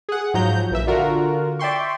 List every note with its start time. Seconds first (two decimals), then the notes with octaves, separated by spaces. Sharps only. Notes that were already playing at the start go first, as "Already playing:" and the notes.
0.09 G#4 F#5
0.34 G#2 F3 F#3 A#5 G6
0.71 A#1 E3 E5
0.87 D3 F4 F#4 A#4
1.59 D5 E5 G5 C6 C#6